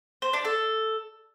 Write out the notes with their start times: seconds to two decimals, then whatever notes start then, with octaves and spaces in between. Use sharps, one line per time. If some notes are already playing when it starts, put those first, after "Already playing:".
0.22 C5
0.33 D4
0.45 A4